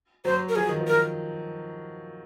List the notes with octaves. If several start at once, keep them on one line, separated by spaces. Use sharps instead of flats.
F#3 C5
A#4
F3 G#4
D#3
F3
A#4